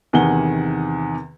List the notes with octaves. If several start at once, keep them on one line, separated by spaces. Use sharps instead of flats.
E2 C3 D#3 F#5 G#5 G7